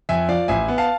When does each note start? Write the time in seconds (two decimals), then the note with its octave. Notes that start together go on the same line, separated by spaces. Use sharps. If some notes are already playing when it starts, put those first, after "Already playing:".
0.09 F2 E5 G#5
0.29 F3 D5 F5
0.48 A1 E5 G#5
0.68 B3
0.78 F5 A5